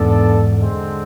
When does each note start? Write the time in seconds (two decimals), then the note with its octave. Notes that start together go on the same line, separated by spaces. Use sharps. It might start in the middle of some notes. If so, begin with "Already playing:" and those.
Already playing: E2 G#2 B3 D4 A4 D5
0.57 D3 G#3 C4